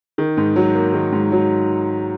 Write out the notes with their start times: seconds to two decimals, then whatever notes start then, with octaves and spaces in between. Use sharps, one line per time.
0.18 D#3
0.37 G#2
0.56 F#3
0.75 A#3
0.93 D#3
1.12 G#2
1.32 F#3